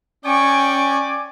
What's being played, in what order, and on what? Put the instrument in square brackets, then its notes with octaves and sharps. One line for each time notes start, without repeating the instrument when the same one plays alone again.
[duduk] C#4 [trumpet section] D5 G#5 D6 [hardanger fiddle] G5 C#6